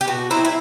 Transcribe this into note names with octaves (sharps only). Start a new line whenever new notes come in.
G4
B2 F#4
F#3 C4 D#4 E4
E4